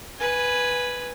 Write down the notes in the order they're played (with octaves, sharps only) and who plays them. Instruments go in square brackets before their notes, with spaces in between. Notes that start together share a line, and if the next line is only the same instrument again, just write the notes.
[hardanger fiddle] B4 G#5